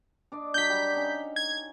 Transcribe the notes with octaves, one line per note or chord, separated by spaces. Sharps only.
D4 D5 D#5
F#3 D4 G6 B6
G3 F#5 A#5
C#4 D#4
G#6